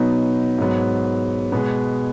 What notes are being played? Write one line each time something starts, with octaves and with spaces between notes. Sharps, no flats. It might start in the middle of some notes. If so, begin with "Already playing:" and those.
Already playing: B2 F#3 B3 D#4
G#2 F#3 B3
B2 G#3 B3